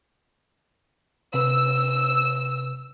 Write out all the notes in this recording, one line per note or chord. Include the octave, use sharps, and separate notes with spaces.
C3 B4 E6